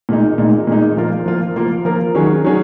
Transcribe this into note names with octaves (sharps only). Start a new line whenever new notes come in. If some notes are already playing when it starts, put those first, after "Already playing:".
A#2 G#3 D#4
A#2 G#3 D#4
A#2 G#3 D#4
F3 A#3 F4 A#4
F3 A#3 F4 A#4
F3 A#3 F4 A#4
F3 A#3 F4 A#4
D#3 F#3 C#4 G#4
D#3 F#3 C#4 G#4